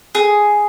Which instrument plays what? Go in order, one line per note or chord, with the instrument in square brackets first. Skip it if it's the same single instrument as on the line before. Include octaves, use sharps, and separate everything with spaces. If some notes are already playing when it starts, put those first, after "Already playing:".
[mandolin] G#4